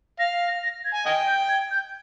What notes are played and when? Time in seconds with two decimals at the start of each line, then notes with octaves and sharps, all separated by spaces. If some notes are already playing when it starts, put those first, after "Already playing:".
0.19 F5 A#6
0.48 A#6
0.63 A#6
0.85 G#6
0.94 G#5
1.06 D#5 G5 G#6
1.27 G6
1.49 G#6
1.71 G6